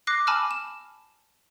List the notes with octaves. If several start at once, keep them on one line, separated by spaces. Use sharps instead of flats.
D6 F#6 A#6 C7
G#5 A5 B5 D6 E6 F6
E7